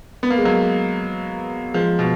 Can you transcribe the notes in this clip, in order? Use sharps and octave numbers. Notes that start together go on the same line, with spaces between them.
B3
A#3
G#3
F#3 A#3
F3 G#3
B2